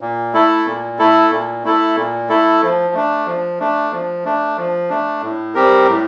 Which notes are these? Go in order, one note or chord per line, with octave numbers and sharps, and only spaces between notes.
A#2
A3 E4 A4
A#2
A3 E4 A4
A#2
A3 E4 A4
A#2
A3 E4 A4
F3
A3 D4
F3
A3 D4
F3
A3 D4
F3
A3 D4
A2
G3 C4 G4 A#4
A2